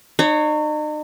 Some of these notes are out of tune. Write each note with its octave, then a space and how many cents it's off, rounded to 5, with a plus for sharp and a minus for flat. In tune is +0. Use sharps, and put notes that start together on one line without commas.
D#4 -40 C#5 +0